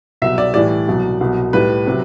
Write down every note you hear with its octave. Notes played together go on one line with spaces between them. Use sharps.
C2 B2 F#3 E5
D5
A2 E3 G3 D5
C2 B2 F#3
C2 B2 F#3
A2 G3 B4
C3 F#3